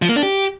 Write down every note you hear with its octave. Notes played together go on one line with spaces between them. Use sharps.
F3
A#3
D4
G4